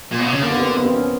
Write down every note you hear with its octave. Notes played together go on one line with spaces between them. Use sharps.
A#2
B2
C3
C#3
D3 A#3
B3
C4
A#3
B3
C4
C#4